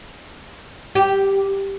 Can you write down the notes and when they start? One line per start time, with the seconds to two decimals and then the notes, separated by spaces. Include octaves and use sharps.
0.95 G4